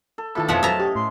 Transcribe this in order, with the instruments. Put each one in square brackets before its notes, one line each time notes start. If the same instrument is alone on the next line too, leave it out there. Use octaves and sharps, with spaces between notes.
[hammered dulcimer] A4
[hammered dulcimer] A2 E3 A5 [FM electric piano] D#3 F4 B5 [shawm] A4
[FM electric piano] F2 B2 [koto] F3 E5 F#5 [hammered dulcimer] C#5 D#5
[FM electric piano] F#3 A4 C5 [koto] E5 A#5 [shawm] A5
[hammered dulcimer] C#4 [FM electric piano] G4
[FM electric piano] A2 [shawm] C6